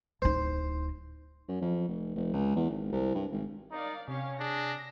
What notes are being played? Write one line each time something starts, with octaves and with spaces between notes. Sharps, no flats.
D1 D#4 C5
F#2
F2
F1
F1
C#2
E2
G#1
C2
G2
G#1
D#4 A#4 D5 F5
C3 C#4 G4 C#5 F5
D4 G#4 A#6